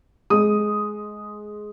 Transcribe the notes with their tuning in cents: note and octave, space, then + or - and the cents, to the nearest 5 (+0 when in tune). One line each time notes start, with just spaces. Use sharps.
G#3 +15 D#6 +0